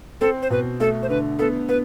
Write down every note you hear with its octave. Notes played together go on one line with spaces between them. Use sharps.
C4 A4
C5
B2 B4
A3 A4
C5
D3 B4
B3 A4
B3 B4